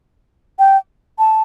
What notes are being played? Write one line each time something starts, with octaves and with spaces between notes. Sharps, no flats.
G5
A5